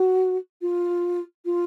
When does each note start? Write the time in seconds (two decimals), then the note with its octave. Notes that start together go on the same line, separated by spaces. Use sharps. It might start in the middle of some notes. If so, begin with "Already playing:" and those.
Already playing: F#4
0.62 F4
1.45 F4